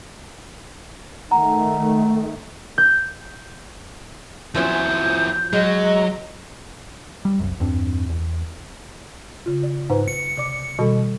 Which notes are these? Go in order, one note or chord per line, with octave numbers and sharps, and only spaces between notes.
D#3 A3 F#5 A#5
G6
F2 F3 F#3 C#4 E4 G6
F#3 G#3 D#5
G3
F#1 C2 F#2
E2 G2 C4 D4
E2
C#3 F4
D5
G#2 B4
C#7
C3 D5 D6
B2 D#3 G3 A4